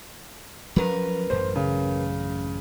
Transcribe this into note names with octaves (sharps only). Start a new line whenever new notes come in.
F3 F#3 C#4 A#4 B4
A1 F#2 C5
C#3